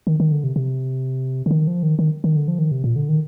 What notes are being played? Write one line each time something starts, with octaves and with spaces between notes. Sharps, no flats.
D#3
D#3
D3
C3
C3
D3
D#3
F3
D#3
D#3
D#3
D3
F3
D#3
C3
A#2
D3
D#3